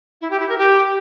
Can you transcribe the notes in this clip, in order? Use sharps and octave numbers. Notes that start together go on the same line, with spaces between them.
E4
G4
E4
A#4
G4